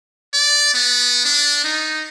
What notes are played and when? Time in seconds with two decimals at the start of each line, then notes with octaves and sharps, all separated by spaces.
0.33 D5
0.74 B3
1.25 D4
1.64 D#4